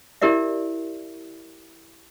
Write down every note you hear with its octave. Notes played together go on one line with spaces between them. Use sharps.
E4 G4 A#4 D5 E5